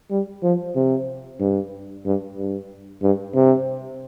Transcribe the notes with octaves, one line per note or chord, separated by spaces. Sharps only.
G3
F3
C3
G2
G2
G2
G2
C3